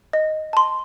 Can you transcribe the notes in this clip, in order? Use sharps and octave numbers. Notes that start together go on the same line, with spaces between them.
D#5
A5 C6